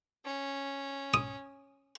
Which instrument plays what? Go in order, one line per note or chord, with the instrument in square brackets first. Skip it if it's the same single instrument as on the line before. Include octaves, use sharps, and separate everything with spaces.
[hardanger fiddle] C#4
[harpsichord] D#6